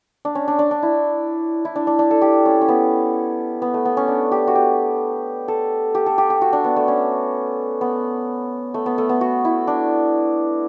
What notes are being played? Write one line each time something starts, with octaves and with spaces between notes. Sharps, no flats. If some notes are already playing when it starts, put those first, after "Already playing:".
D4
C#4
D4
D4
D4
E4
E4
D4
D4
D4
A4
G4
C#4
C#4
B3
B3
A3
B3
C#4
D4
G4
F#4
G4
A4
G4
A4
G4
G4
F#4
D4
B3
A3
C#4
B3
A3
B3
A3
B3
F#4
E4
D4